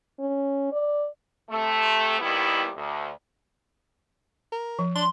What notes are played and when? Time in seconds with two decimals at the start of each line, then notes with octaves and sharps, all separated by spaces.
0.19 C#4
0.72 D5
1.50 C3 A3
2.19 D#2 D#3 G3 B3 E4
2.76 D2
4.52 A#4
4.79 F3
4.96 D4 C6